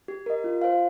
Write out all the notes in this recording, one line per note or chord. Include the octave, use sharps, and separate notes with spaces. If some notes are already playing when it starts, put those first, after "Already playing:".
G4
A#4 D#5
F4
C5 F5